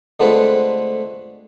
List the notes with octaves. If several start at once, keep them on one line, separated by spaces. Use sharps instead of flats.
D3 G#3 A3 C4 F4 B4